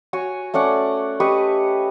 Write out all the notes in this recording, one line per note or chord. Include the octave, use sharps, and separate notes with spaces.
F#4 C#5 G#5
A3 C#4 D5 F#5
G4 B4 D#5 C#6